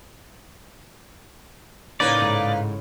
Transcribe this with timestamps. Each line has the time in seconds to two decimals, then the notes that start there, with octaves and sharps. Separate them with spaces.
2.00 A2 C#3 A#3 D#4 B4 D5 G5
2.22 G#2